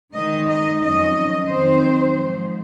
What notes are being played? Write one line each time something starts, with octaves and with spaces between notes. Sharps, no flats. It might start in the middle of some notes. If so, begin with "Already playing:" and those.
D#3 G#3 D#4 D#5
D#5
F2 D#3 F#3 C#4 D#5
F2 D#3 F#3 C4 D#4 C5
G#2 F3 G#3